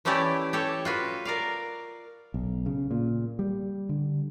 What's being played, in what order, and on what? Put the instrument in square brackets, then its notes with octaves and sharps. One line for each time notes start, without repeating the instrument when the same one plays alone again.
[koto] E3 A3 C#4 E4 G4 D5
G4 A4 C#5
F4 F#4 B4
A#4 D5 F5
[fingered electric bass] B1
C#3
A#2
G3
D3